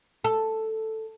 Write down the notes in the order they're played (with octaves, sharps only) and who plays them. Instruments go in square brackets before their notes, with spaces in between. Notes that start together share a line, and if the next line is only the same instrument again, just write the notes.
[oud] A4